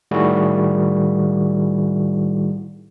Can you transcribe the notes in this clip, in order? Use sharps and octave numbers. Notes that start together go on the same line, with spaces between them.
A2 D#3 G3 E4 F#4 G#4